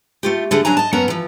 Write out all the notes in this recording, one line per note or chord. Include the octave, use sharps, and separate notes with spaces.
A3 F4 G4
D3 A3 G#4
F#3 D4 G#5 A#5
D#5 A5
F#2 B3 C#4 A#4 F#5 A#5
E3 F3